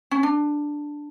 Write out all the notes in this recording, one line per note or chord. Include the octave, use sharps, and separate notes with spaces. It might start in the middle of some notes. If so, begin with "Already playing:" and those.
C#4
D4